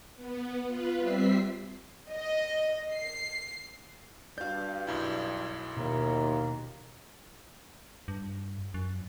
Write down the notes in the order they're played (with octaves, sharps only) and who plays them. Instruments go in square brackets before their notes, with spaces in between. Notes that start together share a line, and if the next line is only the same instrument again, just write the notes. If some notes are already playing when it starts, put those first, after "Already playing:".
[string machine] B3
F4 B4
G3 C4 E5 B6 C7
[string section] D#5
C7
[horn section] G2 [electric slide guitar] F#4 D5 [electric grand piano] F5 G6
[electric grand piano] B1 F#2 E4
[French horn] D#2 [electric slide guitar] B2 [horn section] F4 E5 A#5
[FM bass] G2
F#2